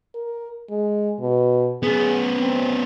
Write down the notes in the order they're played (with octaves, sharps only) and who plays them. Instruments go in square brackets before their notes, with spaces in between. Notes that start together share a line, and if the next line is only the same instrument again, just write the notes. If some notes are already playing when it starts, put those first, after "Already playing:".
[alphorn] A#4
G#3
B2
[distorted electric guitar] B3 C#4 [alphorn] G#4
[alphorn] C4